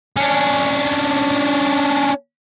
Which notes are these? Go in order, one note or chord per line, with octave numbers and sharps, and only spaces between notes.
C#4 D4